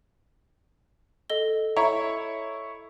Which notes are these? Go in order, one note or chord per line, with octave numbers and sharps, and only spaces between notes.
A4 D#5 G7
E4 C#5 A#5